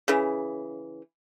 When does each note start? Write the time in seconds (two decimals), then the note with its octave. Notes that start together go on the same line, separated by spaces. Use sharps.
0.08 C#3 E3